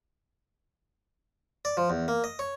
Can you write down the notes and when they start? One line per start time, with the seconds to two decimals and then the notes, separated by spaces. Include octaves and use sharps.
1.65 D5
1.77 F3
1.90 E2
2.08 A#3
2.24 D#5
2.39 C#5